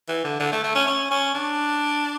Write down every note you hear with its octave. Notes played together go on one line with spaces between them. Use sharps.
E3
D3
D3
A3
A3
C#4
C#4
C#4
D4